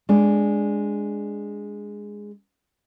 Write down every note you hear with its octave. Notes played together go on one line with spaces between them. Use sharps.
G#3 D4 D5